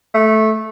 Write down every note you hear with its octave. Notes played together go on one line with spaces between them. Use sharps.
A3